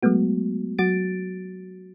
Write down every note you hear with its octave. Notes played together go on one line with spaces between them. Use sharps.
F#3 G#3 A3 B3 F#4
F#3 F#4 A6 D7